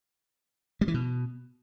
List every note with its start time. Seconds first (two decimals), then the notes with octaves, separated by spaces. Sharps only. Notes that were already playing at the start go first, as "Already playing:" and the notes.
0.81 G3
0.88 E3
0.94 B2